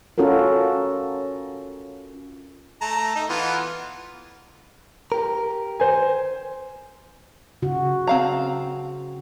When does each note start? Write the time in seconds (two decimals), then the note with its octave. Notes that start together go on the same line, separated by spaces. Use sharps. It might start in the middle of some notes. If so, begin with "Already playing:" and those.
0.18 C#4 F4 F#4 A4 A#4
2.81 A3 A5 A#5
3.15 D#4 A4
3.29 E3 B3 F4
5.12 G4 A#4
5.80 C5 G#5
7.62 C#3 F#4
8.07 C4 F5 A#5